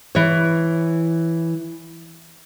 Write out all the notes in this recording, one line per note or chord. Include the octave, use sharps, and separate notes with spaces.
E3 C#5